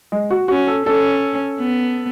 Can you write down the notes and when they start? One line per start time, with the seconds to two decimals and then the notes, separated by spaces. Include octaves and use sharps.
0.12 G#3
0.31 F#4
0.48 C#4 F#4
0.67 A4
0.86 C#4 A4
1.59 B3